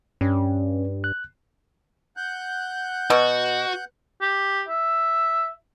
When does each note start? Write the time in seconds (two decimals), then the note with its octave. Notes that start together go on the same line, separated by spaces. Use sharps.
0.21 G2 C#4
1.04 F#6
2.17 F#5 F#6 G6
3.10 B2 F#4
4.21 G4
4.68 E5